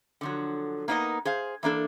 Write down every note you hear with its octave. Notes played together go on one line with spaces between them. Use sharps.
D3 F3 F#3
A#3 B3 D#4 A#4 D#5
G#4 C5 F5
E3 A#3 D4 A4